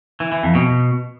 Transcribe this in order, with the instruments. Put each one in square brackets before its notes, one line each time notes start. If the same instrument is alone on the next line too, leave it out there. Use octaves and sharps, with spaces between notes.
[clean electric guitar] E3
E3
F2
B2